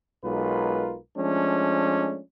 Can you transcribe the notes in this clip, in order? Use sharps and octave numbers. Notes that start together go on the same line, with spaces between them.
B1 G#3 F4 A#4 B4
F3 G#3 A3 C#4 D4